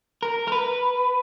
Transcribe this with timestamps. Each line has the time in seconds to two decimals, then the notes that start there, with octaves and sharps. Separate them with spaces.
0.23 A#4
0.48 A#4
0.52 B4